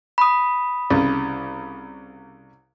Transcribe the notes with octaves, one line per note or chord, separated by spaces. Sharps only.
B5 D#6
C2 C#3